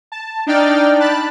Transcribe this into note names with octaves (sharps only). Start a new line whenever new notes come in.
A5
D4 D#4 D5 G5 F6 A6
A5 B5 F#6 A6